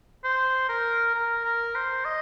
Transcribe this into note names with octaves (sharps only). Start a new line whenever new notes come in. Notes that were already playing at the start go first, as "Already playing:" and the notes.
C5
A#4
A#4
A#4
C5
D#5